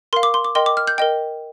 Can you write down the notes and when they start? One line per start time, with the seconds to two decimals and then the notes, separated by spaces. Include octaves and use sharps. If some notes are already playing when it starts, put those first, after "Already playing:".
0.13 A#4 F5 C6
0.23 D6
0.34 C6
0.45 D6
0.55 A#4 D#5 G5 C6
0.66 D6
0.77 F6
0.87 G6
0.98 A#4 D#5 G5